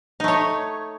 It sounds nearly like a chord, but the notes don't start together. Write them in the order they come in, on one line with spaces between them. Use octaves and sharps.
D#4 A3 C#5